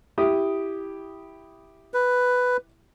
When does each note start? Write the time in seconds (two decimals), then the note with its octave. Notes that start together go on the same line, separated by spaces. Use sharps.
0.18 E4 G4 D#6
1.94 B4